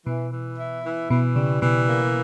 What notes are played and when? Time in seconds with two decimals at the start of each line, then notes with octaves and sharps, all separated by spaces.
0.06 B2 E3
0.32 E3
0.58 E4
0.84 E3
1.10 B2 E3
1.36 C#3 G3
1.61 B2 E3
1.87 A#3